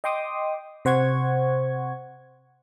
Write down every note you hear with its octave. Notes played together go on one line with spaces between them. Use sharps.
D#5 G5 C6 D6 D#6
C3 C5 F#5 C#6 G#6